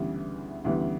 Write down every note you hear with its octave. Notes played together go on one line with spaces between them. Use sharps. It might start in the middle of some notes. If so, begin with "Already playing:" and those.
Already playing: D2 C#3 E3 G3 B3
D2 C#3 E3 G3 B3